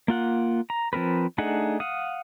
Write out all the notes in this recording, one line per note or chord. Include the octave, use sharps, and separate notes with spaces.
A#3 F4 F#5
A#5
F3 C4 A#4 B4
A3 D4 D#4 G#4 F#5
F5 F#5 D#6